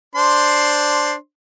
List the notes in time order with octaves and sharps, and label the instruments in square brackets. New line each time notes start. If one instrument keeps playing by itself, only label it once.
[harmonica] D4 C5 C6